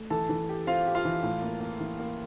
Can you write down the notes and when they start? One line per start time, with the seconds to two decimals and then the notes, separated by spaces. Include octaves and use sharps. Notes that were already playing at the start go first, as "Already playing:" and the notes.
Already playing: A3
0.10 E3 A4 A5
0.29 E3
0.49 G4
0.67 C4 F4 F5
0.87 G4
0.95 F4 F5
1.05 E3
1.23 A2
1.42 A#3
1.61 A#3
1.80 E3
1.99 A#3